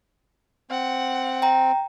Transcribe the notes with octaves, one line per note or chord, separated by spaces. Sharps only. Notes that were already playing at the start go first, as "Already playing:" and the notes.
C4 F#5
G5 A#5